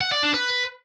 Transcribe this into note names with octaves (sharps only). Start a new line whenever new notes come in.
F#5
D5
D4
B4